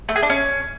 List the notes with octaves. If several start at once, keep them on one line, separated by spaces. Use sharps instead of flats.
A3
G#4
D4
C#4